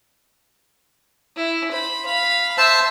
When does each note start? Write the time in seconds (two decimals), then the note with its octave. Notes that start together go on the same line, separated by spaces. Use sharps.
1.36 E4
1.71 C5 B5
2.06 F5 B5
2.58 C5 E5 A5 E6